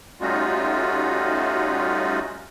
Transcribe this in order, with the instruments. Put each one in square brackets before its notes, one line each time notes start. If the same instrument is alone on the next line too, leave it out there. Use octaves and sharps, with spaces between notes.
[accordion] G3 A3 C#4 D#4 F4 F#4